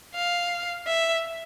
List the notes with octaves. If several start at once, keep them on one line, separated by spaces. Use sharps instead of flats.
F5
E5